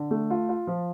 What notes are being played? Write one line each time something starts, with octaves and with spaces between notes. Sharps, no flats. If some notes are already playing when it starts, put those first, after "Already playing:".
Already playing: D3
A3
F4
F4
F3